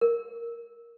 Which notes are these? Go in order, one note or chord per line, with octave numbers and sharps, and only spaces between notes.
A#4